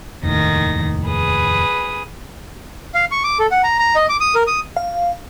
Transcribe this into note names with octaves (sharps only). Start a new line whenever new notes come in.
F1 D#2 A2 D#3 A#6
G#4 B4 D#6
F5
C#6
D6
A4
F#5
A#5
A#5
D#5
D6
D#6
A#4
D#6
F5